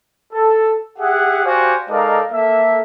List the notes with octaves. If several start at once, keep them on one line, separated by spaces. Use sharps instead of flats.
A4
G4 G#4 E5 F#5
F#4 G4 C5 D5 F5 G#5
G#3 D#4 A4 A#4 D5 F5
A#3 A4 E5